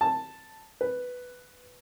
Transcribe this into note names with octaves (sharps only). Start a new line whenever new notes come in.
A5
B4